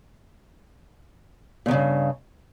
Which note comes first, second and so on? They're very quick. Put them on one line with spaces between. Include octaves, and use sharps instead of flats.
A#2 E2 C#3 G2